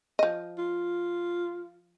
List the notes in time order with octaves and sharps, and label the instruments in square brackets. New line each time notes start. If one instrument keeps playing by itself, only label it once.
[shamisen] F3 D#5
[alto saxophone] F4